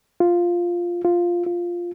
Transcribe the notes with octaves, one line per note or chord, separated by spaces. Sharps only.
F4
F4
F4